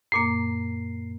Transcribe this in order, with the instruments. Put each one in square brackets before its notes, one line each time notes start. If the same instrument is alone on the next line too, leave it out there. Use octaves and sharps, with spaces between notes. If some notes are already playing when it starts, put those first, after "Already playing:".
[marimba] F#2 A#2 A#3 [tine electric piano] C7